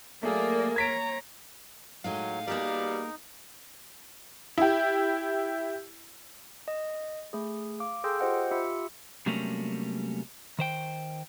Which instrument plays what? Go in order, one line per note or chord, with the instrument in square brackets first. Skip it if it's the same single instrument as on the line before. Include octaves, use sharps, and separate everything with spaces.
[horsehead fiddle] F#3 D5 [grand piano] A3 G#4 [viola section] A#3
[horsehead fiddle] C#5 A#5 [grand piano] G#6 B6 D7
[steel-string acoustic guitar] A2 G#3 D#4 [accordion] F#3 [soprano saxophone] F5
[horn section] B2 G3 [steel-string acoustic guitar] A#3 G#4 A#4 [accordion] D#4
[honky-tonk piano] E4 G4
[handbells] D#5
A3 G#4
F5 D6
G#4 A4 G5 C6 E6 G6
F4 G4 C5 D#5 F#5 G5
F4 G4 E5 B5 E6 C#7
[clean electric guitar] C3 F#3 G3 A3 A#3 C#4
D#3 C5 G5